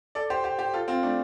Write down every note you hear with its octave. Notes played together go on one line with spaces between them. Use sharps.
A4 D5
G4 C5
G4 C5
G4 C5
F4 A4
C4 F4
A3 D4